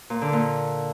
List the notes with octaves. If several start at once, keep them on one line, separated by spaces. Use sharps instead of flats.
A#2
D3
A#2